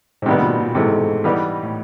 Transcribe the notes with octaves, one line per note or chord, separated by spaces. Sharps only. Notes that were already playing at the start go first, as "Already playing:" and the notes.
G#2
A2 C3 D#3 G3 B3
A#2
B2
A#2
G#2 C3 E3 A3
E3 G3 B3 D#4 G4
A2